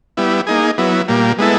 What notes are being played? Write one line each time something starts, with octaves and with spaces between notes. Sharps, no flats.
G3 B3 E4
A#3 D#4 G#4
F#3 B3 E4
A#2 G3 A#3
G#3 B3 E4 A4